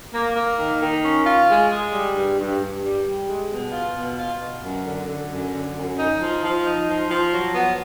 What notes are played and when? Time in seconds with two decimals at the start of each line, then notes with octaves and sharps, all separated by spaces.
0.13 A#3
0.36 A#3
0.58 D#3
0.80 D#3
1.03 C#4
1.25 F4
1.48 G#3
1.70 G#3
1.93 G3
2.15 G2
2.38 G2
2.60 G2
2.83 G3
3.05 G3
3.27 G#3
3.50 B2
3.72 F4
3.96 B2
4.18 F4
4.40 B2
4.63 F#2
4.86 D3
5.08 D3
5.30 F#2
5.52 D3
5.75 F#2
5.98 D#4
6.20 F3
6.43 F3
6.65 D#4
6.87 F3
7.10 F3
7.32 F#3
7.55 B3